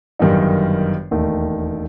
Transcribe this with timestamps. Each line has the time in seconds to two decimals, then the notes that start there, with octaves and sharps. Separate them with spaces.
0.19 G1 F#2 D#3 G3 D#4
1.11 E1 D#2 D#3 A3